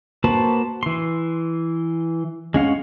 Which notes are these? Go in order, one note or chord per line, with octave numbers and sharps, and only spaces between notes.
A#3 F#4 B4 C5 A5
E3 C6
G#3 C#4 F5 F#5